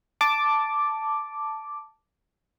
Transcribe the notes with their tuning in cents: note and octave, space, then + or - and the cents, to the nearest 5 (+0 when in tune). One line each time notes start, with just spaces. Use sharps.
A5 +0 D6 +0